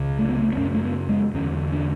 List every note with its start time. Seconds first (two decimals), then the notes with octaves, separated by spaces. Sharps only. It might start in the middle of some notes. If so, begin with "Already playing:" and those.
Already playing: C#2 C#3
0.19 A3
0.29 B3
0.39 A3
0.53 B3
0.57 F#2 C#4
0.61 C#3
0.74 A3
0.83 B3
1.09 G#3
1.34 E2 D3 C#4
1.72 D4